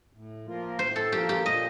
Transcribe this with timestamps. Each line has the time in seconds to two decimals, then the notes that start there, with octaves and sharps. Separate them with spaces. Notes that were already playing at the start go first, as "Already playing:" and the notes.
0.13 A2
0.46 F3 A#3 F4 A#4
0.79 A2 C5
0.96 A4
1.12 F3 A#3 F4 G4 A#4
1.29 G4
1.45 A#2 D#5